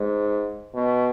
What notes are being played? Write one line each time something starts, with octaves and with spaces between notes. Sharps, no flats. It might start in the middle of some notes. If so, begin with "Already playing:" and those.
Already playing: G#2
B2